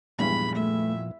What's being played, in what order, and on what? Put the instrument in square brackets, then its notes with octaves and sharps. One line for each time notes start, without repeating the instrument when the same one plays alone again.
[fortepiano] E2 G2 G#3 [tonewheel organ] A#2 F3 [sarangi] B5
[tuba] A3 [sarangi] E5